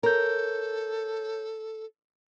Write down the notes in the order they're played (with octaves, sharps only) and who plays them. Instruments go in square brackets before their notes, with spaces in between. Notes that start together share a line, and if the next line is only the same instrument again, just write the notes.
[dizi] A4 [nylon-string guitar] A#4 [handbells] C#5 G6